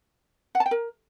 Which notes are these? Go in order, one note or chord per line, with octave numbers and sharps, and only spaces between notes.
F#5
A5
G5
A#4